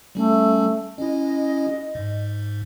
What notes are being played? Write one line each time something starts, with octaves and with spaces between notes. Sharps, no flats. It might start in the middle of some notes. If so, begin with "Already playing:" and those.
G3 A3 C#4
C#4 E4 D#5
G#2